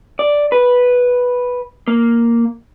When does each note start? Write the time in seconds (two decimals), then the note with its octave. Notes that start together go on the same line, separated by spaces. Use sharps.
0.19 D5
0.52 B4
1.88 A#3